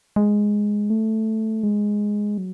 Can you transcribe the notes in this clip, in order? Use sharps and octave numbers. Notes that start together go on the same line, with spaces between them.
G#3
A3
G#3
F#3